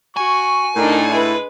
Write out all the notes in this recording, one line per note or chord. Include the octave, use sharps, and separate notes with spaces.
F#4 G#5 C#6
A2 D4 D#4 A#4
G#3 E4 B4